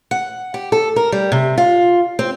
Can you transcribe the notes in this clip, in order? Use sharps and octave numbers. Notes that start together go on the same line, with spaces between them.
F#5
G4
A4
A#4
G3
C3
F4
C4